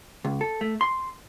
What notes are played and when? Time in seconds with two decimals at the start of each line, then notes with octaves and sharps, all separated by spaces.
0.25 C#2
0.41 A4
0.61 A3
0.81 C6